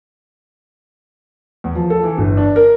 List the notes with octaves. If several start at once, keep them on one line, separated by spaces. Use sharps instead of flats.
E2
F3
A4
E3
G1
D4
A#4